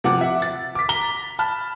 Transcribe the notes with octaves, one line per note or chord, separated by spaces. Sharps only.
C3 F3 F#5 D6
E5 F#5
A6
D6 B6
A#5 G7
A5 B5 F6